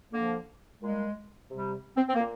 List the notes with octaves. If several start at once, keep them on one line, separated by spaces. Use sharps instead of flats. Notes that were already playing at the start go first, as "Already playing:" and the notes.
D3 F3 A#3
A#2 G3 G#3
C3 G3
C4
C4
A#3
A#2